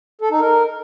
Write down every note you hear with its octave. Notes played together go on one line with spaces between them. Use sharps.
A4
D#4
A#4